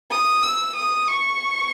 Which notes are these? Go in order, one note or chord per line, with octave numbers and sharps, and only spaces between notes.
D#6
E6
D#6
C#6